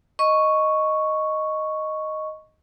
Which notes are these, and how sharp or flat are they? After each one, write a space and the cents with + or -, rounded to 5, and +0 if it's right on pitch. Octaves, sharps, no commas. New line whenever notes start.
D#5 +0 C#6 +0